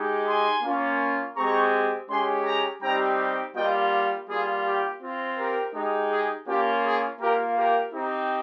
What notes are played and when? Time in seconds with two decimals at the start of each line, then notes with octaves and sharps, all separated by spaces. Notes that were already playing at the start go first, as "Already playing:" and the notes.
Already playing: G#3 D#4 G4
0.27 G#5 C6
0.63 A#3 C#4 F4
1.36 G#3 C4 G4 A#5 C#6
2.09 G#3 C#4 G4 G#5 C6
2.46 G5 A#5
2.82 G3 C4 D#4 G4 G5 A#5
3.55 G3 A#3 F4 D#5 G5
4.28 G3 A#3 F4 G#4
4.65 G4
5.02 C4 F4
5.38 G4 A#4
5.74 G#3 D#4 G4
6.11 G#4
6.47 A#3 C#4 F4 G4
6.84 G#4
7.20 A#3 F4 G4 A#4
7.57 G4 A#4
7.93 C4 D#4 G4